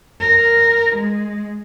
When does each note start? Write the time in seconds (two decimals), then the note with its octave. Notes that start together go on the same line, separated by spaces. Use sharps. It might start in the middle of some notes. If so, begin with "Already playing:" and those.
0.20 A#4
0.96 G#3